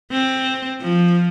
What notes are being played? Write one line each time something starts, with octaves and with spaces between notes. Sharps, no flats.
C4
F3